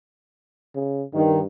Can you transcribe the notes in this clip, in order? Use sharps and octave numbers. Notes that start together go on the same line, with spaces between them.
C#3
G2 D#3